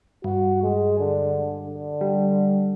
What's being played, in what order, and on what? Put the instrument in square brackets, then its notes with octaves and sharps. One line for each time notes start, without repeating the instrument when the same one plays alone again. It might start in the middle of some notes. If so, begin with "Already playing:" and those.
[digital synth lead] G2 [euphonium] F#4
[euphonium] G#3
D3
D3
[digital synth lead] G3